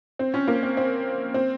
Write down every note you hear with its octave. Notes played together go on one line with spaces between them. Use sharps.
C4
C#4
A#3
C4
C4
C4